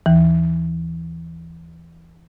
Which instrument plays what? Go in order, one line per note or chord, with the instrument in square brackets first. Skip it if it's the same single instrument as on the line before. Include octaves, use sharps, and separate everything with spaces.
[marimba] D#2 E3